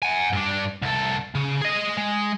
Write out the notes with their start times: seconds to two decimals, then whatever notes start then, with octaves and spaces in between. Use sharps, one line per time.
0.03 F#5 G#5
0.33 G2 D4
0.82 C2 A4
1.35 C#3
1.61 G#4 D#5
1.97 G#3